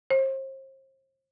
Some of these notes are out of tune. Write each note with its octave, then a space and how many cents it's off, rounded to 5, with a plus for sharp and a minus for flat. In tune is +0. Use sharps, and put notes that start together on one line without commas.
C5 +40